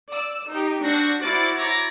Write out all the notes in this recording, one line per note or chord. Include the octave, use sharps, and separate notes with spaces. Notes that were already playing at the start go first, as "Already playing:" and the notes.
D5 E6
D#4 G4
C4 D4 F#4
A#3 E4 F#4 C5 D5
C#5 D5 A#5